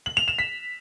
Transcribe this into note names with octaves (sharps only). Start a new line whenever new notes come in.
F#7
F7
E7
B6